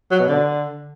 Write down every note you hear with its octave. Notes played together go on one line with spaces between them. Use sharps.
F#3
B2
D3